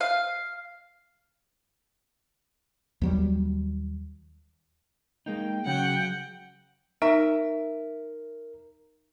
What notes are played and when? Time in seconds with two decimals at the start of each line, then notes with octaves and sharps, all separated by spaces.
0.01 F5
3.02 D#2 F#3 G3
5.26 G#3 A#3 D#4 G5
5.66 C#3 F#3 F#5 G5
7.02 D#4 A#4 E5